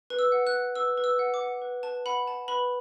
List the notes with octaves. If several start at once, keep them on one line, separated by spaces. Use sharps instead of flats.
B4
E6
F#5
F#6
F#5
B4 E6
B4
E6
F#5
D6
F#5
B4
B4 A5
F#5 B5
F#5 A5
B4 B5